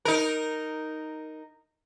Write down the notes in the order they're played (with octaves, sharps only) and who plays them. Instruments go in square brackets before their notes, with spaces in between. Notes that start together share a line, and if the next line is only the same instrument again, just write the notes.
[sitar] D#4 A#4